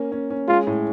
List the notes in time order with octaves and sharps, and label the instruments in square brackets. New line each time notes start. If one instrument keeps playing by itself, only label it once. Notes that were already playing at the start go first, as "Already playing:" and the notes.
Already playing: [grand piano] A#3 C#4
C#4
C#4
[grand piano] G#3 [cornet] F4
[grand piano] A2